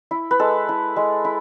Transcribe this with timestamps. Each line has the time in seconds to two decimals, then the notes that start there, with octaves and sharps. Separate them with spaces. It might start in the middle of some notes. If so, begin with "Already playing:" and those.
0.11 E4
0.31 B4
0.40 G#3 A4
0.69 E4
0.96 G#3
1.25 E4